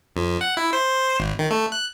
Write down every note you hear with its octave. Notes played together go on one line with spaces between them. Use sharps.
F2
F#5
E4
C5
G#1
D#3
A3
F#6